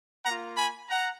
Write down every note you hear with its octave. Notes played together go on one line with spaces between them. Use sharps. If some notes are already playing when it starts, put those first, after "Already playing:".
A#3 F4 F#5 A#5
G#5 B5
F#5 A#5